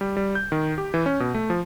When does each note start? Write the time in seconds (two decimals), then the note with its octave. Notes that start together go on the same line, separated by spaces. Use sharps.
0.01 G3
0.17 G3
0.35 G6
0.52 D#3
0.78 G4
0.94 E3
1.06 C#4
1.20 B2
1.34 A3
1.50 F3